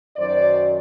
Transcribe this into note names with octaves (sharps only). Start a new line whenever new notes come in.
F#2 D#3 F#3 C5 D5